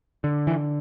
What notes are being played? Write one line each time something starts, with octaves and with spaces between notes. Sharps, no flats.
D3
E3